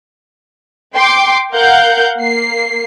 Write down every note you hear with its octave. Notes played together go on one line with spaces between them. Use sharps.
G5 C6 D6
A#4 F5 F#5 G6
A#3 C7